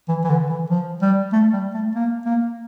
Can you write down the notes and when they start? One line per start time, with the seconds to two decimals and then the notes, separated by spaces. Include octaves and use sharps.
0.08 E3
0.24 E3
0.30 D3
0.49 E3
0.70 F3
1.02 G3
1.32 A3
1.53 G3
1.74 A3
1.95 A#3
2.25 A#3